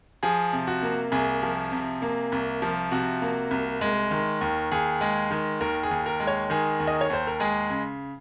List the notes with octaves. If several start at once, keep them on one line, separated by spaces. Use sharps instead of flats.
F3 G#4
C3
F#4
A#3
C2 G#4
F3
C3
A#3
C2
F3
C3 F#4
A#3
C2
G#3
D#3
D#2
D#2 G#4
G#3
D#3
D#2 A#4
G#4
D#2
A#4
G#3
C#5
D#3 G#4
D#2
D#5
C#5
D#2 C5
A#4
G#3 G#4
C#3